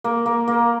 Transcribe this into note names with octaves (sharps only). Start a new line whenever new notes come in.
A#3
A#3
A#3